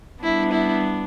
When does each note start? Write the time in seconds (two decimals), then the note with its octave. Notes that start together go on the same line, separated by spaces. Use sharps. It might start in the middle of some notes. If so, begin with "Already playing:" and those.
0.24 G3 B3 D4 E4
0.52 E4